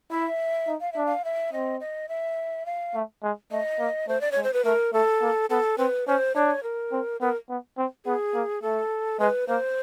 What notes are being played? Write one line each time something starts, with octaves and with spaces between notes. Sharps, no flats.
E4 E5
D#4
F5
D4 E5
F5
E5
C4 D#5
D#5
E5
F5
A3
G#3
A3 D#5
A#3
A3 C5
D5
G#3 C#5
C5
B4
A3 A#4
A3 A4
A#3
B3 A4
C4 B4
C#4 C5
D4 C#5
A#4
C4
B3 A#4
B3
C4
B3 G#4
A#3
A3 A4
G#3 B4
A#3 C5